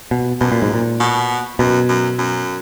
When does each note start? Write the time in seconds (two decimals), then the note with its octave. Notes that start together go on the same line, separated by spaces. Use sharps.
0.11 B2
0.40 F#2 B2
0.52 A#2
0.62 G#2
0.74 A#2
1.00 B2
1.59 F#2 B2
1.89 F#2
2.18 F#2